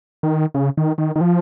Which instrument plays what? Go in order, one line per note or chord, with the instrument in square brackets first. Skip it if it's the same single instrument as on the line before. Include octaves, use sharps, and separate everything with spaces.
[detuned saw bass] D#3
C#3
D#3
D#3
D#3
F3